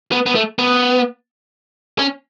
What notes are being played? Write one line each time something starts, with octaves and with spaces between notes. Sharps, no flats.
B3
B3
A3
B3
C#4